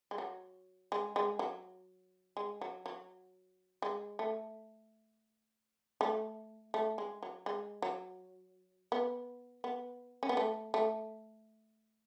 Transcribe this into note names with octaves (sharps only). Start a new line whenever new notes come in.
G#3
F#3
G#3
G#3
F#3
G#3
F#3
F#3
G#3
A3
A3
A3
G#3
F#3
G#3
F#3
B3
B3
C#4
B3
A3
A3